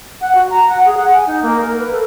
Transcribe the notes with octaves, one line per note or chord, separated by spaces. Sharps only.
F#5
F#4
A#5
F#5
G#4
F#5
G#5
D#4
A#3
A#4
B4
A4